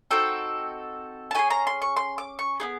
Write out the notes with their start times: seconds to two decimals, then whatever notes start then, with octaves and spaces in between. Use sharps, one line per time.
0.11 C4 D#4 F#4 A4 G5
1.31 A5
1.35 C#4 E4 G#4 G#5
1.50 A#5
1.67 C6
1.82 C#6
1.97 C6
2.18 D6
2.39 C#6
2.60 B3 D#4 G#4 D6